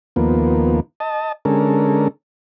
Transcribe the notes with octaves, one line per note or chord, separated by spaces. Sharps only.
D#2 F3 A#3 B3
D#5 A5
D3 G#3 C#4 A4 A#4